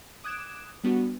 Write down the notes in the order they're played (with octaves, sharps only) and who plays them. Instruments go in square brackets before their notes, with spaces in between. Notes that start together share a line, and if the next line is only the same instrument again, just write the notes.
[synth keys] D6 D#6 F#6 G#6 D7 E7
G3 B3 D4 F#4